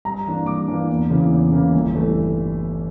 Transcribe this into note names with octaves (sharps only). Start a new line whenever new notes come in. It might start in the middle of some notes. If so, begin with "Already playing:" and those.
G2 A#5
E3 A#3 D4
G2 D6
E3 A#3 D4
E2
C#3 E3 A#3 E4
E2
C#3 E3 A#3 E4
G1
G2 E3 A3